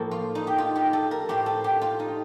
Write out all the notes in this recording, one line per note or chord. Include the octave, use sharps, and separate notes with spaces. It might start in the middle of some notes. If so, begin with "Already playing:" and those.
Already playing: A2 F3 A#3 A4
F4
D#4
G4
F4
G4
A4
A#4
A2 A3 C4 G4
A4
G4
F4
D#4